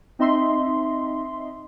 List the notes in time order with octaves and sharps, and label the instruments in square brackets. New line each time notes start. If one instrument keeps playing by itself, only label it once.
[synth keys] C4 D#4 D#5 E5 C6